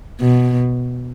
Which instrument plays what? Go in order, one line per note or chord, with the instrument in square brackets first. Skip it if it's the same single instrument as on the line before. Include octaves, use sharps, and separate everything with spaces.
[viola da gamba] B2